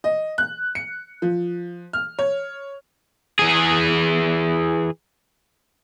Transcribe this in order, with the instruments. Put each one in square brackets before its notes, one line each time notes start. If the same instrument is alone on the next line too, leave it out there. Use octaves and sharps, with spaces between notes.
[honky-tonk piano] D#5
F#6
C#7
F3
F6
C#5
[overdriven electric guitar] E3 G#4